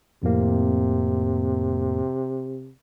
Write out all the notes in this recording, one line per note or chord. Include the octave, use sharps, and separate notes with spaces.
F2 A2 C3 A#3